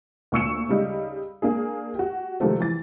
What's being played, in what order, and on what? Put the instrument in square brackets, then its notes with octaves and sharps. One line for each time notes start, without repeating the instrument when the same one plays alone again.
[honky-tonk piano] D2 A#2 C#6 E6 C#7 E7
C#3 G3 D#4
A#3 D4 G#4
F#4 G4
C3 D#3 F3 G3 A3 C4
E3 A6